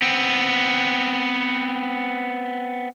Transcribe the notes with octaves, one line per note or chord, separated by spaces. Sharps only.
B3 C4